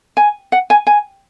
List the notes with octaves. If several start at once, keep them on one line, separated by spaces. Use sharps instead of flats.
G#5
F#5
G#5
G#5